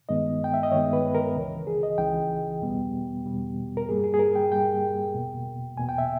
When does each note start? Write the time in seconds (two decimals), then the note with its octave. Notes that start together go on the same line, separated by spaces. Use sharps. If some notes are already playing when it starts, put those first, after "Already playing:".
0.09 G2 D#3 G#3 B3 D#5
0.44 G5
0.54 E5
0.63 D#5
0.72 G2 D#3 G#3 B3 C#5
0.93 B4
1.15 A#4
1.35 C#2 C#3 E3
1.67 G#4
1.83 D#5
1.98 C#2 C#3 E3 G5
2.62 E2 B2 G3 B3
3.25 E2 B2 G3 B3
3.77 A#4
3.88 G2 G3 A#3 G#4
4.04 G#4
4.14 G#4
4.19 A#4
4.35 G5
4.52 G2 G3 A#3 G5
5.15 E2 B2 A#3
5.77 E2 B2 A#3 G#5
5.89 G5
5.98 E5